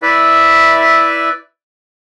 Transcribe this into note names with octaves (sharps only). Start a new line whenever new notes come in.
E4 B4 D5 E5